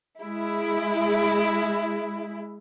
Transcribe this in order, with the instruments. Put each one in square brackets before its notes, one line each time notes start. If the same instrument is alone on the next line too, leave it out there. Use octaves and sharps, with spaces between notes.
[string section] G#3 E4